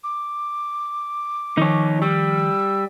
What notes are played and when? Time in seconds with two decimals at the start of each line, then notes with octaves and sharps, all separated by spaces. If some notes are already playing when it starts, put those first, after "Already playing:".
0.04 D6
1.58 D#3 F3 D#4 C#5
2.02 G3 E6